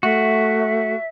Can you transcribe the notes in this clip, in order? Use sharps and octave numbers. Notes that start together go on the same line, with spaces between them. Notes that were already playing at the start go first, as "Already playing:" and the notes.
A3 F#4 E5